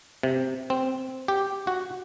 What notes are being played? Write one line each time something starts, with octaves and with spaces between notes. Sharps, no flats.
C3
C4
G4
F#4